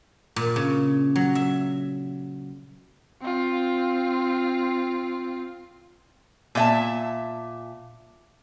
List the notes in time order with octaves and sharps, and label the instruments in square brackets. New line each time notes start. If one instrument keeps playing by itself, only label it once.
[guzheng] A#2
C#3
F#3
E5
[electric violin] C4 F4
[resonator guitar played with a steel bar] A#2 E5 A5